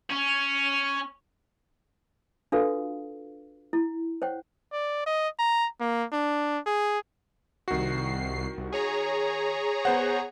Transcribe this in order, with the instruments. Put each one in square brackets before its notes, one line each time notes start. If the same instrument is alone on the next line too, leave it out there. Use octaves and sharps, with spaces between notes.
[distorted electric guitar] C#4
[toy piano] D4 F4 F#4 A4 B4 F5
E4
C5 C#5 F#5 G5
[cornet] D5
D#5
A#5
A#3
D4
G#4
[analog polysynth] C2 C7 [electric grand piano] D#3 F#4
[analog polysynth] C2
G#4 C#5 A#5
[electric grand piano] B3 C5 F#5